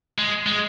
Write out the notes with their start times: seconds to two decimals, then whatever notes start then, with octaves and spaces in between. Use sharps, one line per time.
0.18 G#3
0.47 G#3